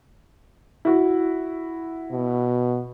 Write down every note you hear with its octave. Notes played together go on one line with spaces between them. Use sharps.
E4 F#4
B2